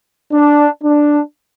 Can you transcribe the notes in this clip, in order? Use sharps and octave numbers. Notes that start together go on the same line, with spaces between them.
D4
D4